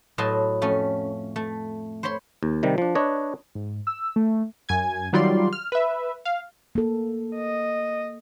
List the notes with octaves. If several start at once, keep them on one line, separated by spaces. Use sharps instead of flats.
A2 F#3 E4 D#5 A5 C6
F2 A3 C#4
A3
C5 C#5 B5 C6
D#2
C3 D#3 G3
F3 D4
D4 B4 C#5 D#5
G#2
E6
A3
F#2 G#5 G#6
D#3 F#3 G3 F4 D5 C6
F6
B4 E5
F5
A#3 A4
D#5